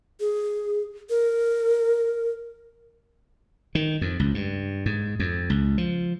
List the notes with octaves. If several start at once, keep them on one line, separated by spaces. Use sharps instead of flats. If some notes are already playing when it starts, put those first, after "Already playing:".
G#4
A#4
D#3
F2
C#2
G2
G#2
F2
C#2
F3